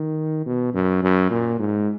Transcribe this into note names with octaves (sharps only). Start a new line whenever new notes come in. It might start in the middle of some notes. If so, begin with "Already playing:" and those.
Already playing: D#3
B2
F#2
F#2
A#2
G#2